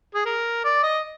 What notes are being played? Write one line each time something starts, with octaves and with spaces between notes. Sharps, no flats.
G#4
A#4
D5
D#5